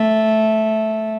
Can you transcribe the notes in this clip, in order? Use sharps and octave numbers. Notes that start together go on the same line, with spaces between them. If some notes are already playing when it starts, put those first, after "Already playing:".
Already playing: A3